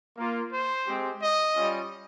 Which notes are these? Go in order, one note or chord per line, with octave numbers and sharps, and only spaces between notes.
A#3 F4
C5
G#3 C4 G4
D#5
G3 C#4 F4